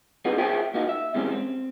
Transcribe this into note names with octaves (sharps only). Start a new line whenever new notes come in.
G3 B3 C4 D#4 F4 G#4
F4 G#4 C5 C#5 E5 G5
A#2 A#3 D#4 F4 F#4
E5
B2 E3 G3 G#3 C4 C#4
C4